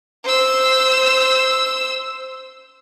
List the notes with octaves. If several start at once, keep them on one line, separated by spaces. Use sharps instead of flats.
C5 E6